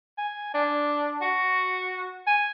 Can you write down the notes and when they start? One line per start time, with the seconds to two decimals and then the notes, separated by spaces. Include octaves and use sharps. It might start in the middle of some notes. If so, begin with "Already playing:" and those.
0.18 G#5
0.54 D4
1.21 F#4
2.27 G#5